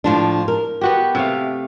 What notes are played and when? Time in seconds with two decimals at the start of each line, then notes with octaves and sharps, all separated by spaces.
0.04 A2 F3 D4
0.48 A#4
0.81 B3 F#4 G4
1.15 C3 A3 F5